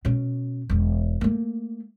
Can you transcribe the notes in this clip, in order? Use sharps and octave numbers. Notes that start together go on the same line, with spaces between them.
B2 C#4
E1 E2
A3 A#3